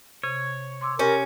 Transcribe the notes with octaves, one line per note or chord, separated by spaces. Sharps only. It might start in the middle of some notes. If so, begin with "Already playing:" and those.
C3 C#5
C6 D6 E6
C#4 G4 A#4